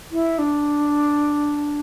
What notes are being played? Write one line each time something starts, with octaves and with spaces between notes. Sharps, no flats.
E4
D4